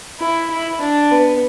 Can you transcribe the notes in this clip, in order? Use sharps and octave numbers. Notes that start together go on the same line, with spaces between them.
E4
E4
D4
B3